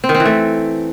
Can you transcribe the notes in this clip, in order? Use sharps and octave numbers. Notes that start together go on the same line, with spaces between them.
C4
D#3
C4
E3
A3